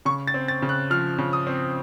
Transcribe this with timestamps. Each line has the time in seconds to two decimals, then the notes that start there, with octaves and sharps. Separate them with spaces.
0.05 C#3 C#6
0.27 A6
0.34 C4
0.48 A6
0.62 C#3
0.69 F#6
0.90 F3 F6
1.18 C#3
1.33 D#6
1.47 C4